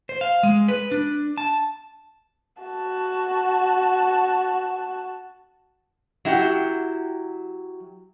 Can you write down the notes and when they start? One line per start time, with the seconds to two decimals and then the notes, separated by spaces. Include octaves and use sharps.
0.09 C5
0.21 F5
0.43 G#3
0.68 B4
0.92 D4
1.37 A5
2.63 F#4 A5
6.25 F#3 E4 G4 F#5